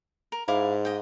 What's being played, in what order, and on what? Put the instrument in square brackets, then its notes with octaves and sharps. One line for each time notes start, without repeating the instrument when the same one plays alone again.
[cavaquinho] A#4
[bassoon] G#2 [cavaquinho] E4 F5 D6
[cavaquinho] D#5 G5